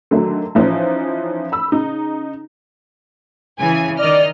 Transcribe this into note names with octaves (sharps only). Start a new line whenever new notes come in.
D3 D#3 F#3 A3
E3 F3 C#4 D#4 C5
B5 E6
C#3 D#4
C#3 E3 G#5
D#3 D5 D#5 F6